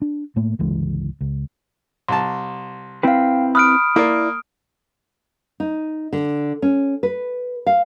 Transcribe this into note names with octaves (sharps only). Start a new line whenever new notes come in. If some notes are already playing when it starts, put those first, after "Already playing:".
D4
A2 A3 A#3
G1 C#2 E3 G#3
C#2
C2 A5 C6
C4 E4 B4 F5 G5
B5 D#6 F6 F#6 D7
A#3 E4 D5
D#4
D3
C#4
B4
F5